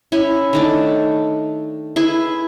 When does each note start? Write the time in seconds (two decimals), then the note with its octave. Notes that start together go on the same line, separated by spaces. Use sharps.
0.12 C#4 E4
0.53 D#3 A3 D4
1.96 E4 G#4 B4